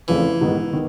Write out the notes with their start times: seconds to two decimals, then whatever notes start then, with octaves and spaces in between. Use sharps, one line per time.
0.08 E2 C#3 E3 F3 A3 C4
0.41 G#2 D#3 G#3 B3
0.73 D#3 B3